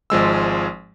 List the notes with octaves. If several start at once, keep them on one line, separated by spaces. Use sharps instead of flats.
G#1 F3 G#3 E6